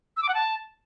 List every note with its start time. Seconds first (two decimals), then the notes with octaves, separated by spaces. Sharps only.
0.17 E6
0.23 D6
0.28 F#5
0.34 A5